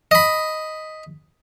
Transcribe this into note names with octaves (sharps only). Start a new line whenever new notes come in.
D#5 B5